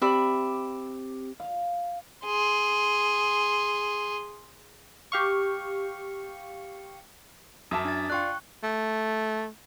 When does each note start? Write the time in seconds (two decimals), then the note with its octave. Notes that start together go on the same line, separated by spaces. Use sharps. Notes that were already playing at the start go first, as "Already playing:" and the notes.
0.02 C4 G4 D5 E5 B5
1.40 F5
2.25 G#4 C6
5.12 G4 F5 C#6
7.71 F#2 E5 A5 D6 D#6
7.85 D4 A6
8.10 D4 F4 G5 C#6 F#6
8.63 A3